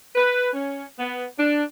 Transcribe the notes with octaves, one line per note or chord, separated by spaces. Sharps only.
B4
C#4
B3
D4